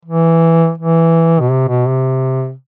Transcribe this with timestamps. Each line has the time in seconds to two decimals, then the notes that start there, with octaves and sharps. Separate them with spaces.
0.05 E3
0.78 E3
1.40 B2
1.51 C3
1.68 B2
1.87 C3